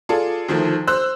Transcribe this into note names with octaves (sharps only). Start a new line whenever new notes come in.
F4 G#4 A4 D5
D2 D#3 F3 A3
C5 E6 F#6